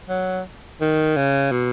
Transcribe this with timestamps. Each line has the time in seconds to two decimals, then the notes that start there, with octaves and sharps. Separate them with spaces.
0.09 F#3
0.81 D#3
1.17 C#3
1.51 B2